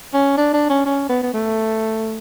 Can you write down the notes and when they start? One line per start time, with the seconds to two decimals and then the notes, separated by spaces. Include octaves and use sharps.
0.14 C#4
0.37 D4
0.54 D4
0.70 C#4
0.86 C#4
1.10 B3
1.23 B3
1.34 A3